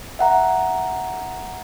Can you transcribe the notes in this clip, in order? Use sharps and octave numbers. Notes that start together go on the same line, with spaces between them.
E5 F#5 A#5